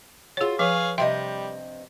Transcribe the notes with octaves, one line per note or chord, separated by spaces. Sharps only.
F4 F#4 G#4 C#5
F3 G#4 B4 C#5 F5
G2 C3 G3 D#5 E5 G5 C6